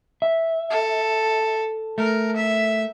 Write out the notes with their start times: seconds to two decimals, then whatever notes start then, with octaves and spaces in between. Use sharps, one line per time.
0.22 E5
0.70 A4
1.98 A3 A#4
2.36 E5